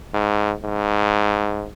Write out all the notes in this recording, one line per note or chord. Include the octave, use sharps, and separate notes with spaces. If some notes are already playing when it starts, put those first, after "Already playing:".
G#2
G#2